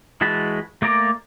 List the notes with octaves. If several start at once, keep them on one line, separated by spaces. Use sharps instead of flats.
E3 G#3 F#4 A5 B5
A3 A#3 D5 A#5 D6